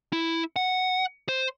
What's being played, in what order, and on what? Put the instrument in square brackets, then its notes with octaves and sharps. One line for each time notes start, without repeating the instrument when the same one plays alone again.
[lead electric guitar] E4
F#5
C5